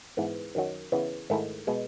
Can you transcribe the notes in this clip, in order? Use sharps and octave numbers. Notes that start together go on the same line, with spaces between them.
G#2 E3 B3
F#2 D#3 F#3
C#3 E3 B3
G#2 D#3 A3 E4
B2 G#3